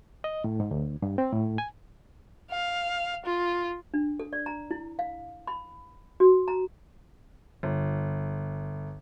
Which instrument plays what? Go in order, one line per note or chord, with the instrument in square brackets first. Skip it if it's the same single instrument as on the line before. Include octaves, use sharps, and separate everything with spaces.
[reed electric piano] D#5
A2
G#2
D2
G2
C4
A2
G#5
[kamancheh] F5
F4
[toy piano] D4
A4
D5
A#5
E4
F5
B5
F#4
A#5
[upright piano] G1